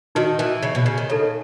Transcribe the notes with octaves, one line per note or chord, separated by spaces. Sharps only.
D#3 D#4 F#4 B4
E3
C#3
B2
C#3
D#3
C#3 D#4 A4 C#5